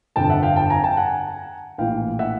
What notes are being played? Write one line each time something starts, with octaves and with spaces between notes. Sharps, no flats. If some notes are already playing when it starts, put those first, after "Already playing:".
G1 F2 D3 G5 A5
E5 F#5
F5 G5
G5 A5
G#5 A#5
G5 A5
F#5 G#5
A#1 A2 E3 F5 G5
E5 F#5